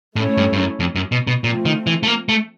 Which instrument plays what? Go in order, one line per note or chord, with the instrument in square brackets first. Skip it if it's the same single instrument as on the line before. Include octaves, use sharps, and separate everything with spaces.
[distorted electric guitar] A2 [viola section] A3 C#4 E4 A4 C#5
[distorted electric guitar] G2
G2
F#2
F2
F#2
B2
B2
[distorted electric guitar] A#2 [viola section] F3 A3 C4
[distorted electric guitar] D#3
E3
A3
A#3
A3